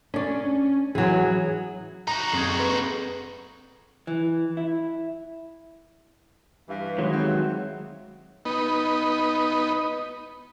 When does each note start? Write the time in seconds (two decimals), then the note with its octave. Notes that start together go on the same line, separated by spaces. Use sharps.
0.14 C#4 D4 D5
0.95 E3 F#3 G#4
2.08 D#4 F#4 A#5
2.33 F#2 C4 G#4 A4 C#6 G#6
2.59 B4
4.07 E3
4.57 E4
6.69 G2 E3 F5
6.98 D#3 F#3 G#3
7.13 C4 F#4 E5
8.45 B3 D#4